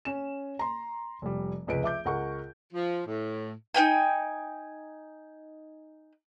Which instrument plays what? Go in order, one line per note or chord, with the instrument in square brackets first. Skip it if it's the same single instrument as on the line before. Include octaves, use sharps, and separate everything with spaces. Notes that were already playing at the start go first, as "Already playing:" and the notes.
[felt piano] C#4 E7
A#5 C6
F1 G3
F1 C#2 B4 D7
E5 D6 G6
C#2 A#4 F#5 C#6
[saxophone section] F3
A2
[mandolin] D#4 C#5 G5 G#5